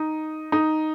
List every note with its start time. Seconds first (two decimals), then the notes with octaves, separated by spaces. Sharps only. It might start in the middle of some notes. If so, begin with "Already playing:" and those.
Already playing: D#4
0.52 D#4